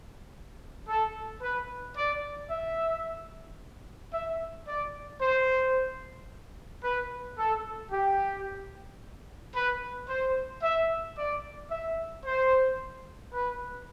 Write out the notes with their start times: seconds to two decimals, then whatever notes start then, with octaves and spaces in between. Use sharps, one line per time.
0.86 A4
1.40 B4
1.95 D5
2.49 E5
4.11 E5
4.66 D5
5.20 C5
6.82 B4
7.36 A4
7.90 G4
9.53 B4
10.07 C5
10.61 E5
11.15 D5
11.69 E5
12.23 C5
13.31 B4